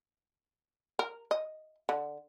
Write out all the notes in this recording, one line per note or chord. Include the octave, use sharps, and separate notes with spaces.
A#4
D#5
D3